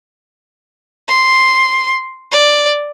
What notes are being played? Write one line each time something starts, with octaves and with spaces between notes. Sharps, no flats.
C6
D5